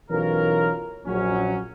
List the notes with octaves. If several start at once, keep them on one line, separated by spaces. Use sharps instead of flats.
B1 E3 C#4 F4 A#4
A#1 F#3 C#4